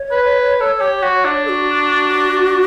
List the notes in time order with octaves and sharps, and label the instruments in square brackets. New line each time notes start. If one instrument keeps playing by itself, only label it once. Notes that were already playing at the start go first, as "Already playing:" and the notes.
Already playing: [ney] C#5
[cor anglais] B4
A4
G4
F#4
D4
[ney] A4
F#4